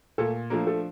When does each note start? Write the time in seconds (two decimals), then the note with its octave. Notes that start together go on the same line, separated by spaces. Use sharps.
0.18 A#2 A3 A4
0.50 F3 A3 A#3 D4 A#4
0.67 A3 A4